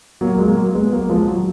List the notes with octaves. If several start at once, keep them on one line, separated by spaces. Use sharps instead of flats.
F#3 A#3
G#3
F#3 A#3
G#3 B3
F#3 A#3
F3 G#3
F#3